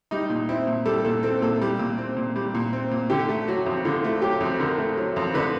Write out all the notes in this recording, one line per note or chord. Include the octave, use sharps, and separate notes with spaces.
G3 D#4
A#2
C4 E4
A#2
G3 A4
A#2 A4
C4 A4
A#2 A4
G3
A#2
C4
A#2
G3
A#2
C4
A#2
D3 G4
A3
F#3 F#4
F2
D3 F4
A3
F#3 G4
F2
D3 A#4
A3
F#3
F2
D3 B4